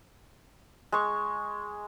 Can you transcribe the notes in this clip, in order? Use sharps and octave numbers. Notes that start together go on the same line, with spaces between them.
G#3 C#6